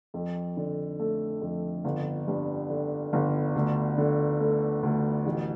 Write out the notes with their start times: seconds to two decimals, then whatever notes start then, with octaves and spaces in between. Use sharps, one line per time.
0.14 F2
0.57 D3
0.99 A3
1.42 F2
1.85 G1
2.28 G2
2.70 D3
3.13 G1
3.55 D2
3.98 D3
4.40 A3
4.83 D2
5.26 A1